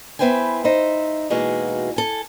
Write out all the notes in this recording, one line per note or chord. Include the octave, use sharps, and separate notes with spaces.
B3 E4 B4 C5 G5 G#5
D#4 C5 E5
B2 E3 G#3 A#3 D#4 F#4
A4 G#5